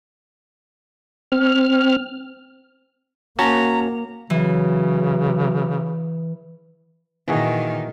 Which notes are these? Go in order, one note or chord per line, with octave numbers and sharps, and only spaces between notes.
C4 F6
A#3 C#4 F#4 A5 A#5
C#3 E3 F#3
A#2 D#3 E3 F#4 G#4